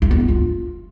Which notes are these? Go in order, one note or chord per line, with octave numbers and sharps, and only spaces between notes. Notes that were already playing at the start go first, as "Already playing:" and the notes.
E4
B3
D4
F4